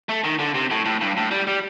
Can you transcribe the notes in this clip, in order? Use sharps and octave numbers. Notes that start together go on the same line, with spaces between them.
A3
D#3
D3
C3
A2
A2
G2
A2
G3
G3